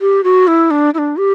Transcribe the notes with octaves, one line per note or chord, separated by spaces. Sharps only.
G4
F#4
E4
D4
E4
D4
G4